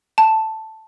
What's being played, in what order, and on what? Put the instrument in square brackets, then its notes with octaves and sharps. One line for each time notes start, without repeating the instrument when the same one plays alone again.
[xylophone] A5